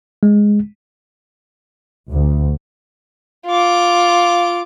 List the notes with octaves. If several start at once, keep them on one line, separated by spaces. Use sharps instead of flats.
G#3
D2
F4 D6